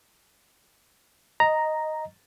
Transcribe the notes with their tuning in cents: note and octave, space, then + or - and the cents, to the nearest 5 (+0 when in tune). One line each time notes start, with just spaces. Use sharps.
D#5 +0 A#5 +0